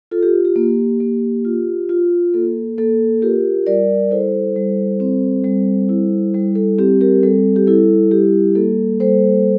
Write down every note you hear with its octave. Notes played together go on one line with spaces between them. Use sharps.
F4 A4
G4
G4
A#3
A#3
F4
F4
A#3 A4
A#3 A4
F4 G4 A#4
G3 A#4 D5
E4 A4 C5
G3
C4
G3
E4
G3
A4
C4 G4
G4 A#4
G3 A4
G4
E4 A4
G3 G4
A#3 A4
G3 A4 C5